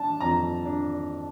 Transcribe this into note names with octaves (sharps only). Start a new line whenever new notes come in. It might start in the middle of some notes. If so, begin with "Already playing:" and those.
Already playing: D4 A5
F2 A#5
D4